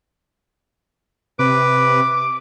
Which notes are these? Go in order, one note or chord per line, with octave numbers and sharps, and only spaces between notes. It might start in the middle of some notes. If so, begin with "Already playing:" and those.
C3 B4 D6